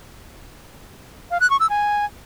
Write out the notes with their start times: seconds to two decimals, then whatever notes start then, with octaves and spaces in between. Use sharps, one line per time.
1.31 F5
1.41 F#6
1.50 C#6
1.60 E6
1.70 G#5